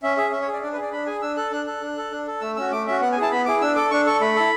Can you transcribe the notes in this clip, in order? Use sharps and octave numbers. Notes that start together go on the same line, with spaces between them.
C#4 E5
G#4 E5
C#4 E5
C#5
G#4 D5
D4 D5
B4
G#4 D5
D4 B5
G#4 G#5
D4 E6
A4 F#6
D4 F#6
A4 F#6
D4
A4
D4
A4
A3 E6
C#4 F#4 E6
A3 D6
C#4 F#4 E5
B3 F#5
G#5
E4 G#4 A5
B3 B5
E4 G#4 D6
D4 E6
A4 D6
D4 C#6
A4 C#6
A3 B5
E4 A4